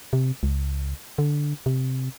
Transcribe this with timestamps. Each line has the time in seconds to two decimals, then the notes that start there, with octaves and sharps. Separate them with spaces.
0.13 C3
0.43 C#2
1.18 D3
1.66 C3